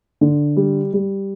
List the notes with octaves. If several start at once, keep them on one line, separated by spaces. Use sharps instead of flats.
D3
G3
G3